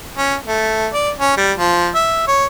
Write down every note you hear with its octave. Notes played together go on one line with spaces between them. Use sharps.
C#4
A3
D5
C#4
G3
F3
E5
C#5